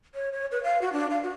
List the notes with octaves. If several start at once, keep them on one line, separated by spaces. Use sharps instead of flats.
C#5
C#5
B4
F5
F#4
D4
F5
F#4